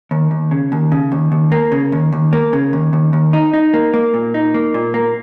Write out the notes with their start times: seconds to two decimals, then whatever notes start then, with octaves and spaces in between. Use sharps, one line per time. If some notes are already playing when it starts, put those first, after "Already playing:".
0.11 D#2
0.31 D#2
0.51 C#3
0.72 D#2
0.92 C#3
1.12 D#2
1.32 D#2
1.52 A#3
1.72 C#3
1.92 D#2
2.13 D#2
2.33 A#3
2.53 C#3
2.73 D#2
2.93 D#2
3.13 D#2
3.33 D#4
3.54 D#4
3.74 A#3
3.94 A#3
4.14 A#2
4.34 D#4
4.54 A#3
4.74 A#2
4.94 A#3